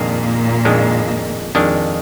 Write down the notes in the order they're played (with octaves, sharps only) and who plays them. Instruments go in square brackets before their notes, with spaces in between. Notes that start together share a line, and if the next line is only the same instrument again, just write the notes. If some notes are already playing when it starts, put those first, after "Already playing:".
Already playing: [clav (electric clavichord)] F2 D#3 G#3 D4 [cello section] A#2 A#3
[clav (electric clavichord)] F2 D#3 G#3 D4
F2 D#3 G#3 D4